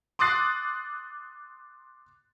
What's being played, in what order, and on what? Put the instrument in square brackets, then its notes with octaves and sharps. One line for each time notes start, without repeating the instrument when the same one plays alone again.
[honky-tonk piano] C6 D6 D#6 F#6 A6 C7